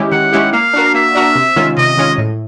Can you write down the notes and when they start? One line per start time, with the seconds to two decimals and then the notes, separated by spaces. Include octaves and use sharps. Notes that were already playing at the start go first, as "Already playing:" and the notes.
Already playing: D#3 G#3 C#4 E4 G4
0.12 D#3 F#5
0.33 G#3 C#4 E4 G4
0.53 A#3 F5
0.73 D4 F#4 A#4
0.94 A#3 E5
1.15 D4 F#4 A#4
1.35 C3
1.56 D#3 G#3 C#4 F4
1.77 C3 D#5
1.98 D#3 G#3 C#4 F4
2.18 A2